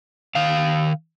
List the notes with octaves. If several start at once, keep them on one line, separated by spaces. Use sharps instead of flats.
D#3 F5